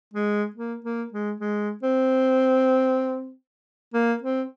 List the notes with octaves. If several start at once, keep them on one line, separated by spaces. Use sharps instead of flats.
G#3
A#3
A#3
G#3
G#3
C4
A#3
C4